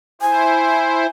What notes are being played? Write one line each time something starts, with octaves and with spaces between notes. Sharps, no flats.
E4 C5 G#5